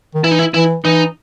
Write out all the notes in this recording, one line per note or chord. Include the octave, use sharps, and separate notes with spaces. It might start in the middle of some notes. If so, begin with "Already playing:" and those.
D#3
E3 E4
D#4
E4
E3 E4
E3 D#4